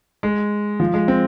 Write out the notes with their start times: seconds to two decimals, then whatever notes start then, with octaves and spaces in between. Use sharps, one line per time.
0.23 G#3
0.80 F3
0.94 G#3
1.08 C4